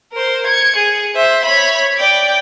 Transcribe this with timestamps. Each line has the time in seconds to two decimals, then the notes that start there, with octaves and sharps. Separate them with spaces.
0.12 A#4 C5
0.47 G#6 C#7
0.76 G#4
1.15 C5 E5
1.45 C#5 B5
1.98 D5 G5